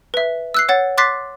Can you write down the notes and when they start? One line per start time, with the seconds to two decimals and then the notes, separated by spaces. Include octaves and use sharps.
0.14 B4 E5
0.54 E6 F#6 C7
0.69 C#5 F#5 A6
0.98 C6 D6 F#6 A6 B6 C7